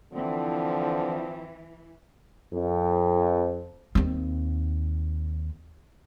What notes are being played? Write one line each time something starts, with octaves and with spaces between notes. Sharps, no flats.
D3 E3 F3 C4
F2
D#2 C4